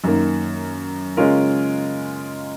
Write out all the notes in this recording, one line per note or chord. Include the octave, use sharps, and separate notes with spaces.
F#2 D#3 A#3
C#3 G#3 C#4 F4 A#4